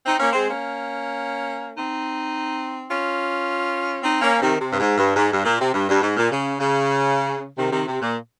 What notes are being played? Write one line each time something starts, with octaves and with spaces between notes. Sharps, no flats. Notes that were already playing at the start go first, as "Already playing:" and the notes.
C4 D#4
A#3 C#4
G#3 C4
A#3 C#4
C4 D#4
C#4 F4
C4 D#4
A#3 C#4
C3 D#3
C3
G2
G#2
G2
G#2
G2
A#2
C3
G2
G2
G#2
A#2
C#3
C#3
C3 D#3
C3 D#3
C3
A#2